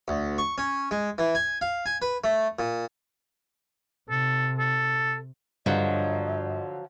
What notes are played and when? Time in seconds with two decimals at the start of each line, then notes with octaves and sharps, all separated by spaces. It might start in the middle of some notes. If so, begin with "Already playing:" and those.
0.08 D2
0.38 C#6
0.58 C#4
0.91 G#3
1.18 E3
1.35 G#5
1.61 F5
1.86 G#5
2.02 B4
2.24 A3
2.59 A#2
4.10 C3 A4
4.58 A4
5.66 G2 D3 F3 F#3 D#5